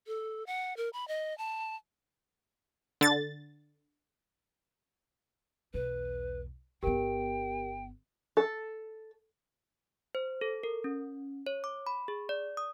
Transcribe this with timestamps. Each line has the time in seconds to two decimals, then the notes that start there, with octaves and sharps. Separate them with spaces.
0.07 A4
0.46 F#5
0.77 A#4
0.93 B5
1.08 D#5
1.38 A5
3.01 D3 A6
5.74 B1 E2 B4
6.83 G1 B3 G4 A#4 G5
8.37 A4
10.15 C5
10.41 A4
10.63 A#4
10.84 C#4
11.47 C#5
11.64 D6
11.87 B5
12.08 G#4
12.29 D5
12.57 D#6